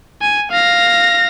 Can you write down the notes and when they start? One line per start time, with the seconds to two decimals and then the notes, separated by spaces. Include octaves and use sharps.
0.22 G#5
0.52 F5 A#6